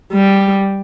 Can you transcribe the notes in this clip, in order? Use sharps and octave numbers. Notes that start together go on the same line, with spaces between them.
G3